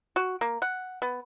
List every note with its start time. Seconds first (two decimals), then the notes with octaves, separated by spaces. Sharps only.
0.16 F#4
0.41 A#3
0.62 F#5
1.02 B3